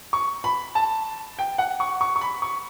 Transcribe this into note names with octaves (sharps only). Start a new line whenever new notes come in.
C#6
B5
A5
G5
F#5
C#6
C#6
C#6
B5
C#6